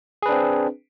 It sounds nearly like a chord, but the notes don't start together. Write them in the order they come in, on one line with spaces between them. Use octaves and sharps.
G#4 B4 D4 C4